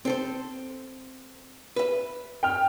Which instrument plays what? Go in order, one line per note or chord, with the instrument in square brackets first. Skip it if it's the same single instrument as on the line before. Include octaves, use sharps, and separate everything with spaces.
[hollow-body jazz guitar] C4 A4 C5
B4 E5
[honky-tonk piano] G5 F6